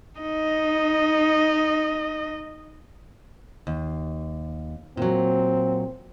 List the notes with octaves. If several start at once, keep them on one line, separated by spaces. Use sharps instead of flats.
D#4 D#5
D#2
A#2 F#3 C4